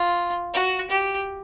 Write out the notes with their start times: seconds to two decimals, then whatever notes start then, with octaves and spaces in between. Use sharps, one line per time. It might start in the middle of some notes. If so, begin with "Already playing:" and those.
Already playing: F4
0.53 F#4
0.90 G4